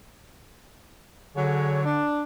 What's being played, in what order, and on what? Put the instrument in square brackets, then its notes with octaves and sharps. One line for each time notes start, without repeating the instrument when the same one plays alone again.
[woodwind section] D3 [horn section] F#3 G#4 C#5
[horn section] D4